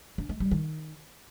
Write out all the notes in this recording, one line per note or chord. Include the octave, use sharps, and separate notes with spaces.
D4
G#3
G3
D#3